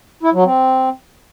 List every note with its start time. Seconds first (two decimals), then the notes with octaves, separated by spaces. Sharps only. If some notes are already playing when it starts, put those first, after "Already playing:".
0.23 E4
0.34 F#3
0.44 C4